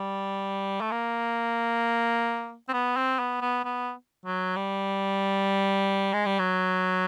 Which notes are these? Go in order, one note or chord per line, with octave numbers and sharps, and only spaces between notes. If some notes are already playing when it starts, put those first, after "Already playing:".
Already playing: G3
A3
A#3
C4
B3
C4
B3
B3
B3
F#3
G3
G#3
G3
F#3